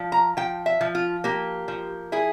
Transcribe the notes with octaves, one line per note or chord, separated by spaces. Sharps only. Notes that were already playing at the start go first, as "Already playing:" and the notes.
Already playing: F3
A#5
F3 G5
E5
F3
F4
A#3 G4
F3
E4 G#4